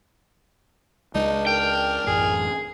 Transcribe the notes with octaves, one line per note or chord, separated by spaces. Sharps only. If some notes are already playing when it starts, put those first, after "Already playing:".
C#2 G#3 D4 D#4
A#4 G5
A1 F#2 G#4